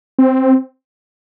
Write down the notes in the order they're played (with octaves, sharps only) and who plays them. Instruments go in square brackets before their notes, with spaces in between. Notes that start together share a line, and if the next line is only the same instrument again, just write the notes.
[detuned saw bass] C4